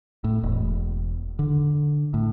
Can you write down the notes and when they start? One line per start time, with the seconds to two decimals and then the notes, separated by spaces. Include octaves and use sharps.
0.24 A2
0.43 E1
1.39 D3
2.14 A2